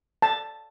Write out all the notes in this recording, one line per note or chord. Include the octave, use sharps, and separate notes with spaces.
A5